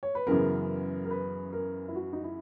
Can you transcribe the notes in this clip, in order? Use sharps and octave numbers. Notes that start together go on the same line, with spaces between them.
C#5
B4
F#2 C#3 E3 B3 A#4
A#4
B4
A#4
E4
F#4
D#4
E4